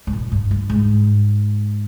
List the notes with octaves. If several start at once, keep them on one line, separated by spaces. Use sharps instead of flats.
G#2
A#2
G2
G2
G#2